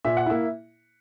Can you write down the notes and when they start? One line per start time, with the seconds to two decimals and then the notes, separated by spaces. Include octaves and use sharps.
0.05 A#2 E5
0.17 F#5
0.26 A#3 E4 E5